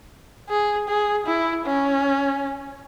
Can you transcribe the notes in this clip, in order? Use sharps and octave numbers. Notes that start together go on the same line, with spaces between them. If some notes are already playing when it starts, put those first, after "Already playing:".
G#4
G#4
E4
C#4